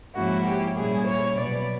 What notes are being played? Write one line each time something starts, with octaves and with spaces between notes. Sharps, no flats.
G#2 F3 A#3 C#4 E4 F#4
G4
A#2 G3 A#3 C#4 E4 G#4
C#5
B2 F#3 B3 D5